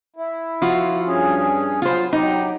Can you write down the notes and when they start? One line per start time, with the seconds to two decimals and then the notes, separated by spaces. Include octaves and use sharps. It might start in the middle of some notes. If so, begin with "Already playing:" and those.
0.16 E4
0.62 F3 F4 F#4
1.06 G2 C#4 G#4
1.82 F#3 F4 C5
2.13 F#3 D#4 G4